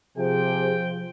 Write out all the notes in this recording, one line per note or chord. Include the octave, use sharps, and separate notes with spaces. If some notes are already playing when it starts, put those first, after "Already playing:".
C3 F3 G#4 C5 G5